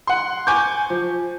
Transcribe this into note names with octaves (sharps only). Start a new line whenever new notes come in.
F#5 C6
G#5 C#6 D6 G6
F3